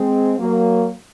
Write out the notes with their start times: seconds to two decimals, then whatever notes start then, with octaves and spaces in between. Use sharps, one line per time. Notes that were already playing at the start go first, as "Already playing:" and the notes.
Already playing: G#3 C4
0.37 F#3 A#3